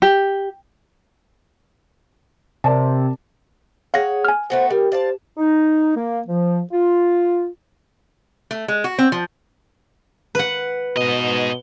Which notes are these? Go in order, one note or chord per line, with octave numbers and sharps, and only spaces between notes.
G4
C3 A#4 D5 A5
G#4 C#5 F5 F#5 A#6
G#5 F6
A3 B3 F#4 C5
G3 G4 A#4
C5 D5 F5 A5
D#4
A#3
F3
F4
A3
G#3
F#4
C4
F3
B4 F#5
G#2 B2 D#5